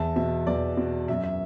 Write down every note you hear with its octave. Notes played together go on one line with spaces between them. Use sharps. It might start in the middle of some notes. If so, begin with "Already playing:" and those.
Already playing: E2 E5 A5
B2 E5
E2 D5
B2
F#2 E5
E5